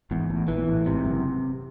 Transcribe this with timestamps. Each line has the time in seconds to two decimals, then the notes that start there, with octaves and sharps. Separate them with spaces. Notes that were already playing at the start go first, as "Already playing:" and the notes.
0.11 G#1 E2 G#2
0.30 A1 A2
0.48 A#1 A#2 E3
0.68 A1 A2
0.86 G#1 G#2 C3
1.05 F#1 F#2